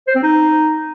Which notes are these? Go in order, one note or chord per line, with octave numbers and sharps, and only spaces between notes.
C5
C4
D#4